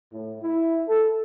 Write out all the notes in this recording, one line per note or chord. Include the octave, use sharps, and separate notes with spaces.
A2
E4
A4